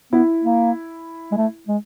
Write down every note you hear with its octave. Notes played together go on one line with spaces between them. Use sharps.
B3 E4
A#3
G#3
A3
G#3